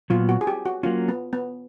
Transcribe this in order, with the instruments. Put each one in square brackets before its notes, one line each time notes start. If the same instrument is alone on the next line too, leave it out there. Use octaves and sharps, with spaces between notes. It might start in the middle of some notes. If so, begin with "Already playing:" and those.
[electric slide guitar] A#2 F#3 B3 [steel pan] F4
[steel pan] F#4
G#4
G4
F#4
[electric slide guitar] F#3 A#3 C#4 [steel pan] F4
[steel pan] B3
B3